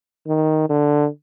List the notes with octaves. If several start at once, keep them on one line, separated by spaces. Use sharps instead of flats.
D#3
D3